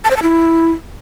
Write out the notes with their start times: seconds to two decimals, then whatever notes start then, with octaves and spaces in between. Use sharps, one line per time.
0.05 A5
0.11 C5
0.17 A5
0.23 E4